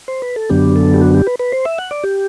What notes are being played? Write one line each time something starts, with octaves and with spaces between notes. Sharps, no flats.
C5
B4
A4
F#2 D3 F#3 B3 D4 G4
A4
G4
F#4
G4
B4
B4
C5
E5
F#5
D5
G4